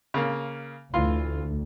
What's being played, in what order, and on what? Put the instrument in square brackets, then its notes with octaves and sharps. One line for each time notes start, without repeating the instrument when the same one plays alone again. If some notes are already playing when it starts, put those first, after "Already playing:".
[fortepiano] C#3 A#3
[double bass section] D2 [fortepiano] E3 F4 C6